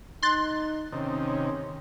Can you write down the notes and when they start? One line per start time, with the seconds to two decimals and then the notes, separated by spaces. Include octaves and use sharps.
0.23 D#4 C6 F#6 A6
0.92 C3 D#3 C#4